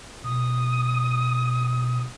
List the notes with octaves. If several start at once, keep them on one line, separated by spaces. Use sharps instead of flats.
B2 D#6